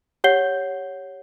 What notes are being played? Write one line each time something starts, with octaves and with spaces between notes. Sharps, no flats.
G4 C#5 F#5 G6 C7 G7